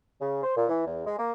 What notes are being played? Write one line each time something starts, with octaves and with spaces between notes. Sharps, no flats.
C#3
C5
A#2
E3
E2
G#3
A#3